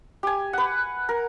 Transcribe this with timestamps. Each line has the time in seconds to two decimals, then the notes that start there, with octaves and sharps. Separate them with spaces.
0.23 G4 G#5
0.53 B4 F#5
1.09 A#4